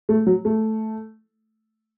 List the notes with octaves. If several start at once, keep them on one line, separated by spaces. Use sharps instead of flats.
A3
F#3
A3